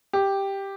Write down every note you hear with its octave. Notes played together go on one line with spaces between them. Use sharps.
G4